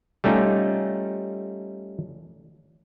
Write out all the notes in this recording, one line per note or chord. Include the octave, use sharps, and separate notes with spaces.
G3 A3 C#4 D#4 F4